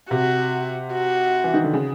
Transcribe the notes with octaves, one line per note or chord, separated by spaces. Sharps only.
C3 F#4
F#4
E3
D#3
D3
C#3